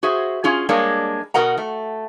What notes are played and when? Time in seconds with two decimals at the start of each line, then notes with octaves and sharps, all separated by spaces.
0.03 F#4 G#4 C5 E5
0.44 C#4 F4 G#4
0.69 G3 G#3 A#3 D4 C#5
1.34 B2 F#4 A#4 D#5 F#5 A#5
1.58 A3